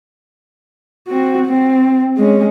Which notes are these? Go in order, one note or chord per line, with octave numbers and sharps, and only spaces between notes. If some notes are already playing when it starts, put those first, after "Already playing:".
C4 F#4
C4
G#3 C#4